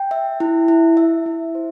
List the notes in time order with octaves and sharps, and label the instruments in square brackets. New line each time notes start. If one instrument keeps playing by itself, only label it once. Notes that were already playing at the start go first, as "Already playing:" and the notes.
Already playing: [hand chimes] G5
E5
E4
E4
E5
E4
C5